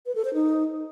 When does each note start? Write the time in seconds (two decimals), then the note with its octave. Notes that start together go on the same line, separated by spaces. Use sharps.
0.06 B4
0.15 A4
0.25 C5
0.34 D#4